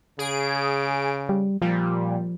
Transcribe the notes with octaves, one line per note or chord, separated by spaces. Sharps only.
C#3 G#4 D7
G3
A#2 F3 G3